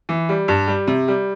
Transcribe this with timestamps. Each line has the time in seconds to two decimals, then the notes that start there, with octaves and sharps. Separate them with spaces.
0.09 E3
0.29 G3
0.48 G2
0.67 G3
0.87 C3
1.08 G3